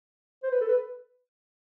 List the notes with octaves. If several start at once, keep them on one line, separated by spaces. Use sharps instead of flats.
C5
B4
A4
B4